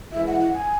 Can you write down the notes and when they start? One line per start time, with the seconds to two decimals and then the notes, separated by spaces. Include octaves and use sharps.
0.12 F#2 E3 G#3 E4 E5
0.27 F#5
0.41 F#5
0.54 G#5